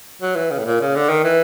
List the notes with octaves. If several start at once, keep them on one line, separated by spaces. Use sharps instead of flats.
F#3
E3
C#3
A2
A#2
C#3
D3
D#3
E3